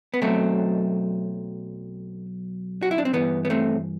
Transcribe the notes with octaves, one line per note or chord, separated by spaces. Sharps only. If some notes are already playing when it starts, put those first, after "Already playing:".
B3
B1 B2 F#3 A3 C4
F#4
E4
D4
C4
G2 E3 B3
B3
A3 C4